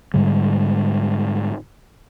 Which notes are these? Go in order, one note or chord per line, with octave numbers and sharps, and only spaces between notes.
G#2 D3 G3 G#3